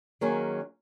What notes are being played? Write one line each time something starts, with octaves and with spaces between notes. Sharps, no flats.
D#3 F#3 A#3 C#4 G#4